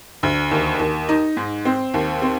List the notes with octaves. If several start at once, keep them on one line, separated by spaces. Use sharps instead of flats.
D2
D#2
D#2
D#4
G#2
C4
D#2
C4